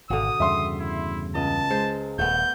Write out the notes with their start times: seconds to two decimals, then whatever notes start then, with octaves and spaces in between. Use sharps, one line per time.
0.10 G#1 B2 D3 D#6
0.40 E2 G2 C#3 E5 C6
0.80 E4
1.35 C#2 D#5 A5
1.70 G#3 C5
2.19 D#1 A3 B3 G6